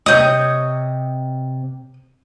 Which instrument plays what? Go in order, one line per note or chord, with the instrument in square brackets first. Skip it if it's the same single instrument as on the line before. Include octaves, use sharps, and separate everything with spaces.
[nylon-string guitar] C3 C#5 D#5 [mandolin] D#6 G6